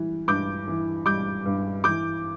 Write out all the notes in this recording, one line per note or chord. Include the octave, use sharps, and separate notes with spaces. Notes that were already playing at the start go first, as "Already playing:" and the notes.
Already playing: E3 G3
G2 D6 G6
E3
G3 D6 G6
G2
E3 D6 G6